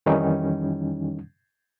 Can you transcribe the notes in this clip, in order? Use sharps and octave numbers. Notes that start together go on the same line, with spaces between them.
F2 D#3 E3 G3 C#4 D#4